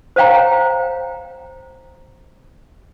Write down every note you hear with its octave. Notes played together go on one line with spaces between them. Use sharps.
C5 C#5 F5 G5 A#5